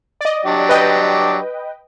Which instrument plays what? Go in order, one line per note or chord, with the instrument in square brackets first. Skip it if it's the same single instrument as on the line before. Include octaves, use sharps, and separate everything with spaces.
[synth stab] D5 D#5
[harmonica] F#3 D4 G4
[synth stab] B4 D#5 G5